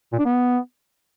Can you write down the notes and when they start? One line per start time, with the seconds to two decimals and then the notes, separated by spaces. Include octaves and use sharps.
0.13 A#2
0.19 D4
0.25 B3